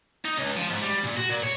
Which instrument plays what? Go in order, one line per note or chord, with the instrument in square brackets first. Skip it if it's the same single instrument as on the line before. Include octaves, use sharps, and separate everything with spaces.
[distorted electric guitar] D#4
C#2
F3
G#2
G3
A#2
F#4
A#2
C#5